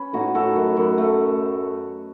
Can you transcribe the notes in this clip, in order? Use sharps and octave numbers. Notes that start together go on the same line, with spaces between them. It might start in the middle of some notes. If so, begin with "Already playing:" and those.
Already playing: C#4 B4
A2 D#4 F#4
A3 F#4 A4
F#2
F#2
A3